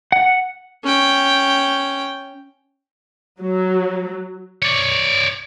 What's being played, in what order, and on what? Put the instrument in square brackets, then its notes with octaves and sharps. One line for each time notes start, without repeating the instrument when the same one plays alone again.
[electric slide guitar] F#5
[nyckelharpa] C#4 G5
[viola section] F#3
[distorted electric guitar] C#5 D5